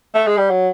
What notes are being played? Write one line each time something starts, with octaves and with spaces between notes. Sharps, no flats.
A3
G#3
G3
F#3